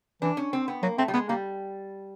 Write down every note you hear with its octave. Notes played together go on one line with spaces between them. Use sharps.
E3 D4
C#4
C4
B3
F#3 A#3
A3 C4
G3
G#3 B3
G3 A#3